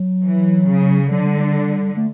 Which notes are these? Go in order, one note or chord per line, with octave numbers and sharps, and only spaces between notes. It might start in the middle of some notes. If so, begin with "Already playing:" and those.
Already playing: F#3
E3
C#3
D3 F#3
G3
G3
A3